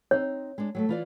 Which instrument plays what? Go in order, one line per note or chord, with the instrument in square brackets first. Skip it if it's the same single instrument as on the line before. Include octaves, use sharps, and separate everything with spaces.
[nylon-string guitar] C4 D#4 [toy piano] C#5
[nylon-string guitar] G#3 D4
F#3 G#3 A3
E3 F4 D5